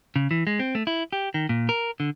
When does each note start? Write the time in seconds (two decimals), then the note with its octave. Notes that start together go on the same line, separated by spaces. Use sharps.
0.16 C#3
0.31 E3
0.47 G#3
0.59 C4
0.75 A3
0.87 E4
1.13 G4
1.34 D#3
1.49 A#2
1.69 A#4
2.00 D3